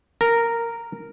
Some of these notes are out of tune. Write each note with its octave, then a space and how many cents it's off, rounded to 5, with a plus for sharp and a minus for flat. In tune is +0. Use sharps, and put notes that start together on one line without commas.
A#4 -5